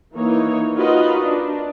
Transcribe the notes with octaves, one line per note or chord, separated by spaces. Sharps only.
E3 A#3 D#4 C#5
D#4 F4 F#4 A#4 B4 D#5
D4